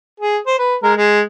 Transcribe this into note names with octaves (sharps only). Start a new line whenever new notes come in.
G#4
C5
B4
G#3 A#4
G#3